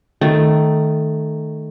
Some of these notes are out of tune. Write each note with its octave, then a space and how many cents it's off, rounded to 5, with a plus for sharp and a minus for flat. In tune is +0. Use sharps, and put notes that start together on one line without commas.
D#3 -10 A3 +0